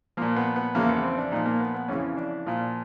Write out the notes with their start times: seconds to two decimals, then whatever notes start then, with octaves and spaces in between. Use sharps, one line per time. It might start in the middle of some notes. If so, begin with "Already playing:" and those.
0.17 A#2 F3 A#3
0.36 B3
0.56 B3
0.75 E2 C#3 F3 A#3
0.89 B3
1.03 C4
1.18 D4
1.32 A#2 F3 D#4
1.46 A#3
1.60 B3
1.74 B3
1.88 F2 C#3 E3 C#4
2.17 D4
2.46 A#2 F3